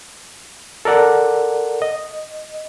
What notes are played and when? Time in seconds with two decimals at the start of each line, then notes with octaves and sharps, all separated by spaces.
0.85 A4 A#4 D5 F#5
1.82 D#5